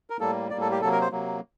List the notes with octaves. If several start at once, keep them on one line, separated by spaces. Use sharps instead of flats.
A#4
A2 G3 A#3 A4
A2 G3 A#3 D5
A4
G4
C3 F#3 A#3 A4
A#4
C5
C3 F#3 A#3